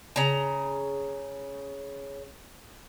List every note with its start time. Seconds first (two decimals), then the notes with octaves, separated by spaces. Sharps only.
0.16 C#3 A#5